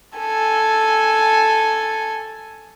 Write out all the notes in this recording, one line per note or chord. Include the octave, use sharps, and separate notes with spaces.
A4 G#5